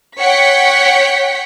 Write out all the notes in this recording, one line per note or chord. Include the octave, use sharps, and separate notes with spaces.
C#5 F#5 G5 B6 C#7